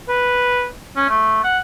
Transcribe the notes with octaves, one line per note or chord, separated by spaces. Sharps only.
B4
C#4
A3
F#5